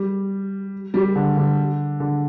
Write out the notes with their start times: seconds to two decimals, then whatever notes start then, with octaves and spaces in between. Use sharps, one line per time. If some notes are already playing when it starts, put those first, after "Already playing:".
Already playing: G3
0.94 G3
1.16 D3
1.37 D3
2.00 D3